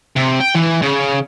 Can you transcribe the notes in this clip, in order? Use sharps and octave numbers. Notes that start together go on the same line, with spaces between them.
C3
G5
E3
C#3